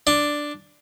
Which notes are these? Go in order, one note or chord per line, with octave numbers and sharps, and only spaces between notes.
D4